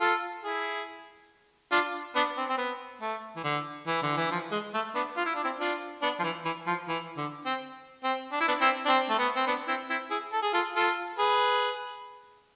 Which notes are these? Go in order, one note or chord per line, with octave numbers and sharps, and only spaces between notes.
F4 A4
E4 G#4
D4 F4
B3 D4
C4
C4
B3
A3
E3
D3
E3
D3
E3
F3
G#3
A3
B3 D4
F4
E4
D4
C4 E4
D4 F4
B3 D4
F3
E3
E3
F3
E3
D3
C4
C4
D4
E4
B3 D4
C4 E4
D4
C4
A3
B3
C4
B3 D4
C4 E4
C4 E4
E4 G#4
A4
G#4
F4 A4
F4 A4
G#4 B4